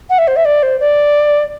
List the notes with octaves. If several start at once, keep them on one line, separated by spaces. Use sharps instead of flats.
F#5
E5
C5
E5
D5
C5
D5